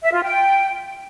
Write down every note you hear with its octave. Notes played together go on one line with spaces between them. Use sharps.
E5
F4
G5